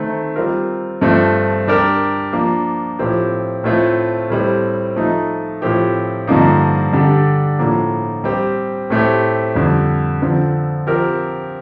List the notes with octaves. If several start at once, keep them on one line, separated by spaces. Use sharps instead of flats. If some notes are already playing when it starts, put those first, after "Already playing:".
Already playing: D#3 A3 C4
G3 C4 F4 A#4
G2 F3 A3 C4
G3 D4 G4 A#4
F3 A#3 D4
A2 F3 C4 G4
A2 A3 C4 F4
A2 G3 C4
F3 A3 D#4
A2 F3 C4 G4
G2 D3 F3 A#3 D#4
D3 G3 D4 G4
A2 F3 A#3
G3 C4 G4
A2 A3 C4 G4
F2 D3 G3
D3 F3 C4
F3 C4 G4 A#4